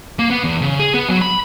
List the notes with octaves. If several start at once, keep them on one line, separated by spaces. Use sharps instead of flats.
A#3
B3
E2
C#3
G#4
B3
F#3
B5